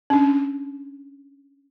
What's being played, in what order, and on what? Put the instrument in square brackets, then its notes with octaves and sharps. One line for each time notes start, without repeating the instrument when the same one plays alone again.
[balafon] C#4 D4